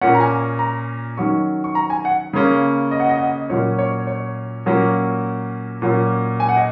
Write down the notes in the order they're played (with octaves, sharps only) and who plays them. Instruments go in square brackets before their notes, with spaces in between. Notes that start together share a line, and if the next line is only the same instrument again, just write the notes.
[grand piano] A#2 A#3 C#4 F#5
A#5
G#5
A#5
D#3 F#3 C#4 C#6
C#6
A#5
G#5
F#5
C#3 A#3 C#4
D#5
F#5
D#5
F#5
D#5
A#2 F#3 A#3 C#4 C#5
C#5
C#5
A#2 F#3 A#3 C#4
A#2 F#3 A#3 C#4
G#5
F#5
D#5